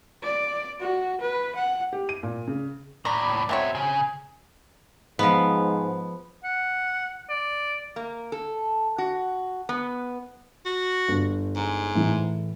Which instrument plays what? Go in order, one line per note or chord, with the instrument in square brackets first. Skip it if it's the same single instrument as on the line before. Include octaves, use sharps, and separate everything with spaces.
[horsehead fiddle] D5
F#4
B4
F#5
[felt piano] G4
D#7
A#2
C#3
[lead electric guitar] D#2 A2 [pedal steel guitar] D5 B5 [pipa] A#5
[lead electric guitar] B2 E5 [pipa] F#3 C4 C#5
[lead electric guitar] C#3 [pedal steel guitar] G#5
[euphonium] G#2 [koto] F3 B3
[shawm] F#5
D5
[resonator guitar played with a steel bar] A#3
A4
F#4
B3
[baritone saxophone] F#4
[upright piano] G1
[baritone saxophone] G#2
[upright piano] A2 E3